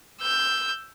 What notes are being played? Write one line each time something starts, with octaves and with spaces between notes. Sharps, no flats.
E6 G6